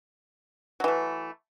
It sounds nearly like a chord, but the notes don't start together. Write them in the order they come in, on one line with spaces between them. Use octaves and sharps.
F#3 E3 A3